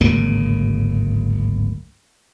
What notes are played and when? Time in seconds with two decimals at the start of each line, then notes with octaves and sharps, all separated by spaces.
0.01 D1 G#1 C#3 A#3